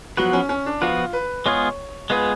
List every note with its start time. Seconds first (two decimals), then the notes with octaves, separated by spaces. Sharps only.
0.17 F3 F#3 B3 F#4 B4
0.33 C#4
0.49 C#4
0.66 D4
0.81 F3 B3 F4 F#4 B4
1.13 B4
1.45 G#3 B3 F4 G#4 C#5
2.10 G#3 B3 F4 G#4 B4